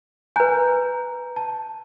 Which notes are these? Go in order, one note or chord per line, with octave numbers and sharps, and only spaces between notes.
B4 G#5 A#5 F#6 G6
A5